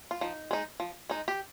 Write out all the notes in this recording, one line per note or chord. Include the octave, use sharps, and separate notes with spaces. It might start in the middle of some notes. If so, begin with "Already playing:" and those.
F4
F3 D#4
G#3 D#4
F3
G#3 D#4
G4